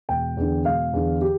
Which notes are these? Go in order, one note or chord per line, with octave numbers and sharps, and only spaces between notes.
E1 G5
E2 D3
E1 F5
E2 D3
G4